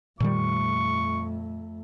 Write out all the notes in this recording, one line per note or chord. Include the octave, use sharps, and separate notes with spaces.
F2 A#2 D#3 G3 A3 C#6